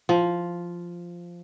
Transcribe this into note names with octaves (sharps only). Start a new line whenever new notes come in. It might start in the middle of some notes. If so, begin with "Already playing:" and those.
F3